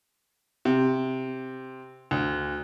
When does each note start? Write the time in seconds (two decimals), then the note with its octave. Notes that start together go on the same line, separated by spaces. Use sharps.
0.65 C3
2.11 D2